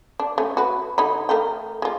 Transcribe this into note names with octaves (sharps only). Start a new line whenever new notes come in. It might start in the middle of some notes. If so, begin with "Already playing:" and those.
D4
A3 C#4
F#4 B4
D3 D#4 B5
A3 A#4 G5
G#3 F4